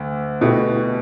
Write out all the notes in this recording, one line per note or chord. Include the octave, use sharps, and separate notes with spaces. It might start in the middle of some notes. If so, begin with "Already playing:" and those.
Already playing: D2
B2 A3 E4 G4